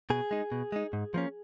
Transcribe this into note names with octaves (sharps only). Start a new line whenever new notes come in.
B2 G#4
G#3 D#4
B2
G#3 D#4
G#2
F3 A#3 C#4